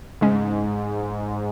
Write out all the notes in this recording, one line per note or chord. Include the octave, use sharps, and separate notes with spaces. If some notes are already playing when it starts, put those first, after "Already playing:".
G#2 C#3 G#3 C#4